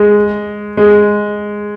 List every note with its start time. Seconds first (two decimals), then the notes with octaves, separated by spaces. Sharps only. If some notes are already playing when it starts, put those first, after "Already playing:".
Already playing: G#3
0.77 G#3